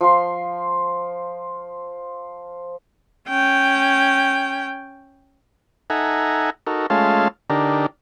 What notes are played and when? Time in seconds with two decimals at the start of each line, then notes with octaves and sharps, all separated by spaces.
0.01 F3 F5 C6
3.29 C#4 G5
5.90 D#4 A4 E5 F#5 G#5 A#5
6.67 D#4 F#4 A4 A#4
6.90 G#3 A3 C#4 F4 F5 A5
7.50 D3 D4 D#4 G4 A#4